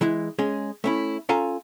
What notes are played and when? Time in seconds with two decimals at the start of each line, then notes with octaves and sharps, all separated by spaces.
0.01 E3 G#3 E4
0.39 G#3 C#4 G#4
0.84 A3 C#4 E4
1.29 C#4 F4 A4 F5 G#5 A#5